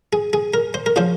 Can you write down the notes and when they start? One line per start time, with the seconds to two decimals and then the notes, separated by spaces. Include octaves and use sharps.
0.13 G#4
0.33 G#4
0.54 A#4
0.74 C5
0.86 A#4
0.96 C#3 F3 C5